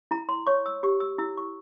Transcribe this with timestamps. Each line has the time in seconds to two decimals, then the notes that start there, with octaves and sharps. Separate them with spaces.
0.11 E4 A#5
0.29 C6
0.47 C#5 C#6
0.66 E6
0.83 G4 C#6
1.00 E6
1.18 E4 E6
1.37 C#6